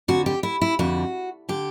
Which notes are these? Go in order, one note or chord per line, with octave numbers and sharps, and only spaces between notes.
F2 D3 F#4
G4
E4
E4
F2 D3 F#4
D3 G4